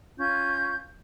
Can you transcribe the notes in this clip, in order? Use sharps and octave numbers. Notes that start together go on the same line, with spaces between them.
C#4 F4 G6